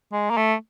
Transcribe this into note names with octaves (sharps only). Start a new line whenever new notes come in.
G#3
A#3
A3